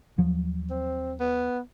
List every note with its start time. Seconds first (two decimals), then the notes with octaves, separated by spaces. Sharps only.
0.18 D#2 F3 F#3
0.70 C4
1.20 B3